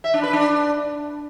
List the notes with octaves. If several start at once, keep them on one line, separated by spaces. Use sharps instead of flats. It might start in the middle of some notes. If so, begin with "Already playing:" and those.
E5
D4
B4
D4